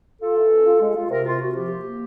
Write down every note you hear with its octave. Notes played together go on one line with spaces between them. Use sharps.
F4 A4
E3
C#4
F4
G#3
F4
C3 A#4
C3 F4
C3 F#4
F3 G4
A#3
A#3